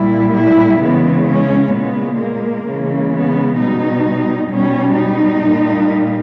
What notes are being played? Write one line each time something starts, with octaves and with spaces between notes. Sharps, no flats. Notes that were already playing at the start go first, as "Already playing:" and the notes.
Already playing: A#2 G3 E4
E4
C#3 E3 G#3 B3
C#4
A#2 G#3 B3
A#3
C#3 E3 G#3
B3
B2 G3 D#4
B2 G3 C#4
D#4
A#2 G3